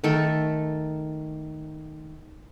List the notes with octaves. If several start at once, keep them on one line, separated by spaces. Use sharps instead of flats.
D#3 A3 A4